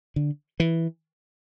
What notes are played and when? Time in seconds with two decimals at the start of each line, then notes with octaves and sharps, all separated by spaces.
0.16 D3
0.60 E3